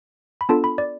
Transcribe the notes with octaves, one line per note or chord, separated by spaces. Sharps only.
B5
B3 D4 F4 A4 A5
B5
D5